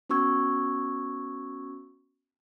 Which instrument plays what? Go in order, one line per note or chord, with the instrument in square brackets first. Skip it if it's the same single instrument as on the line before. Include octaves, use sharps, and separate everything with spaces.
[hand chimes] B3 C#4 F#4 C#6 E6 G#6